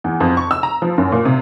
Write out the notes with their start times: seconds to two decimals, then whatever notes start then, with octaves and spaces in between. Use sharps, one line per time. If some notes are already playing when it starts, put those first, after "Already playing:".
0.04 E2
0.20 F2
0.37 C#6
0.51 E6
0.63 A#5
0.82 F3
0.98 F#2
1.12 A#2
1.25 C3